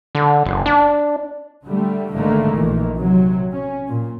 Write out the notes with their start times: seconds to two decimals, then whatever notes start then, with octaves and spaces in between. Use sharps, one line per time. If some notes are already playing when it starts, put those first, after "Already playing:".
0.15 D3
0.45 F#1
0.66 D4
1.63 D3 G3 A3
2.11 G#1 G#2 D3 D#3 A3 A#3
2.55 A#1 A#2 D#3 E3
2.97 C3 F#3
3.52 C#4
3.87 A#2